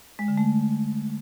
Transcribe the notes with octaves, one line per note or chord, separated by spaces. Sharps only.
G#3
D3
A3